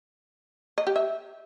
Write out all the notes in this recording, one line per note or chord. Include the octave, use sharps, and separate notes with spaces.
D#5
G4
E5